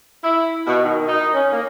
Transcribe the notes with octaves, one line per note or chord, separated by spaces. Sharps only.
E4
B2
D#3
D#4
C#4
A#3